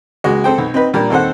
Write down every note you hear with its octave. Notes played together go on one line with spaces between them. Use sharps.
C#2 G#3 F#4
C4 A4 C5 G5
B1
C4 D#4 B4
A#2 G3 D4 A#4
D#2 C4 A4 C5 F#5